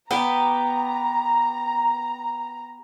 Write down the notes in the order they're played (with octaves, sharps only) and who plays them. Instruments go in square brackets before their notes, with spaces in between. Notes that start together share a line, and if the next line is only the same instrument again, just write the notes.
[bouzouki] B3 G4 [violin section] A#5